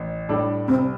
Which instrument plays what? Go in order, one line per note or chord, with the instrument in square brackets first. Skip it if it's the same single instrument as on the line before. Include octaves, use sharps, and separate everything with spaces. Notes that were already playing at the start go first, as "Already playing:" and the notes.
Already playing: [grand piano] A1
A2 G3 D4 A4
[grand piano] C2 [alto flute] C4